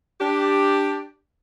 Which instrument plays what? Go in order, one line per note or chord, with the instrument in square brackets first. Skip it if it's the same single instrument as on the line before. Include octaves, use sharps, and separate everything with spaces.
[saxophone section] D4 G4